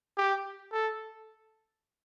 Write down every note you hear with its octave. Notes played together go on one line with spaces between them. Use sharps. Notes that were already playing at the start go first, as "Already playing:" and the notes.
G4
A4